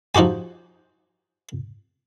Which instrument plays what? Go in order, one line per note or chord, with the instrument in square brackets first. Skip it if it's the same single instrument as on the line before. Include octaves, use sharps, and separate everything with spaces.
[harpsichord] F3 D#4 F#4 G4 G#5